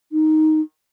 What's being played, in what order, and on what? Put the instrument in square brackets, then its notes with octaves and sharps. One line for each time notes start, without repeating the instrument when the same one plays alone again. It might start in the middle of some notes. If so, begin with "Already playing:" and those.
[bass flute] D#4